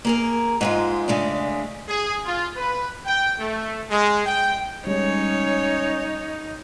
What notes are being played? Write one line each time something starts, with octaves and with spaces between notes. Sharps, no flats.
A#3 G#4 A#4
G#2 G#3 F4
C#3 G#3 A3 D4
G#4
F4
B4
G5
A3
G#3
G5
G3 G#3 C#4 D#4 C#5